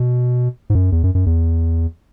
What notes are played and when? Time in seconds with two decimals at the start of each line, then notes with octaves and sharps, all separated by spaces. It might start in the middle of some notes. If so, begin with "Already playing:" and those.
Already playing: B2
0.70 G#2
0.75 F#2
0.92 E2
1.03 F#2
1.15 F#2
1.26 E2